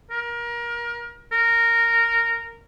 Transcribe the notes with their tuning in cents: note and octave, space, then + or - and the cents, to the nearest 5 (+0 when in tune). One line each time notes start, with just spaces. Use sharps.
A#4 +25
A#4 -10